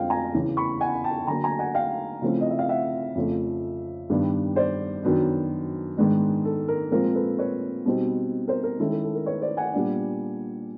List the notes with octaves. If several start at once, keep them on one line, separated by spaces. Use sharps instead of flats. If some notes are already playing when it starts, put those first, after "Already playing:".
Already playing: F2 D3 F3 G#3 C4 F5 G5
G#5 A#5
E2 C#3 E3
B5 C#6
F#5 G#5
G5 A5
D3 F#3 A#3 G#5 A#5
G#5 A#5
F#5 G#5
F5 G5
C#3 F3 A3 C4 E4
D#5
E5
F5
E5 F#5
F2 C#3 F3 A3
G2 D#3 G3 B3 D4
C5 D5
F#2 D#3 F#3 B3 D4
G#2 D#3 G#3 B3 D4
A4
A#4
A#2 F3 G#3 C4 F4 A#4
A4 B4
B4 C#5
B2 G3 C4 D#4
A#4 C5
A#4
D#3 G#3 C#4 E4 A4
A4
A4
A#4
B4 C#5
C5 D5
F#5 G#5
A#2 G3 B3 D4